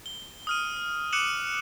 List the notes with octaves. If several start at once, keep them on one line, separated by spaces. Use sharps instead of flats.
G7
D#6 F6 D#7
D6 F#6 C#7 D#7 E7 F#7